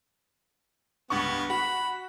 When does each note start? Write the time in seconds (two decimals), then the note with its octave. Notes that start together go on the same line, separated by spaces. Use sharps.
1.10 C#2 G2 B3 C#6
1.50 F#4 B5